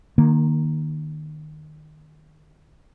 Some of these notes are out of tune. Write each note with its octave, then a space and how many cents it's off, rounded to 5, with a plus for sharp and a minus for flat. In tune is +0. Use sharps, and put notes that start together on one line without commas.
D#3 -25 A#3 +0